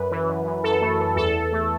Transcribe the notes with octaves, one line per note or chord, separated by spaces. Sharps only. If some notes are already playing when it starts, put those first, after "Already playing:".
Already playing: F#2 B4
E3
F#2
F#2
F#2 A4
A3
E3
E2 A4
E2
A3